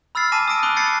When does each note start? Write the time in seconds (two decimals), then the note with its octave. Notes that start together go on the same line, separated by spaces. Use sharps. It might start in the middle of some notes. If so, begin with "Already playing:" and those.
0.15 B5 E6 F6 A6 C7
0.32 G#5 A5 D6 A#6 D#7
0.48 D#6 E6 A#6 D7 D#7
0.63 B5 D6 D#6 F#6 D7 G7
0.76 E6 G6 A6 A#6 C7 C#7